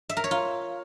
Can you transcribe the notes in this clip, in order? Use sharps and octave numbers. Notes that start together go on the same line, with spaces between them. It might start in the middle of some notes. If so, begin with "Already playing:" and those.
E5
A#4
C#5
F4